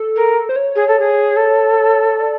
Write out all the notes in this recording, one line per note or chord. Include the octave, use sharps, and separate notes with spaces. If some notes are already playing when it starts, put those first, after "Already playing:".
Already playing: A4
A#4
C5
C#5
G#4
A4
G#4
A4
D5